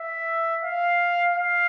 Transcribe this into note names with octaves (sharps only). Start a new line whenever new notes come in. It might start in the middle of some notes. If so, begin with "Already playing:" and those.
Already playing: E5
F5
F5